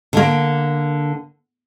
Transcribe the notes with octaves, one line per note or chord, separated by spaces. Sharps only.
D3 A#3